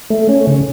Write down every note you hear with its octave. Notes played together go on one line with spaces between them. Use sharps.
A3
C#4
C#3